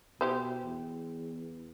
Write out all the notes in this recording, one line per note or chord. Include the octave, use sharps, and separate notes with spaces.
B2 E3 G4 C5
E2